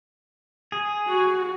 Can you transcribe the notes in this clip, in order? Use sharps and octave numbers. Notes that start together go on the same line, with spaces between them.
G#4
F#4